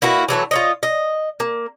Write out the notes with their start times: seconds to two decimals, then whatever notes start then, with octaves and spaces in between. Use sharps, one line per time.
0.02 A#3 E4 F#4 B4
0.29 E3 F#3 A3 C#5
0.51 F4 C#5 D#5
0.83 D#5
1.40 A#3